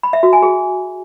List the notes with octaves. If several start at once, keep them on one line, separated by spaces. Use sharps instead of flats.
B5
E5
F#4
G#5
G#4